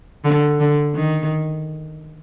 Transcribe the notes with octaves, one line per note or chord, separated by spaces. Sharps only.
D3
D3
D#3